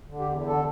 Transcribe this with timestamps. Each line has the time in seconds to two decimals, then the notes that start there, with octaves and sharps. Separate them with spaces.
0.09 D3
0.20 G4
0.28 E2
0.47 D3 A4